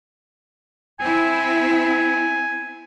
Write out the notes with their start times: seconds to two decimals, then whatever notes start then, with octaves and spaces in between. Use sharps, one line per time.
1.00 C4 E4 G#5